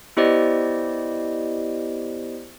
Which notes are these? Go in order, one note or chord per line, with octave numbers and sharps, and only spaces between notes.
B3 E4 G4 C5 D5 D#5